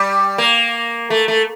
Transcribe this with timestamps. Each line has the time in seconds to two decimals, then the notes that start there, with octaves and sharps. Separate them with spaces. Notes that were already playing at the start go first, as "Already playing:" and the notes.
Already playing: G3
0.38 A#3
1.10 A3
1.28 A3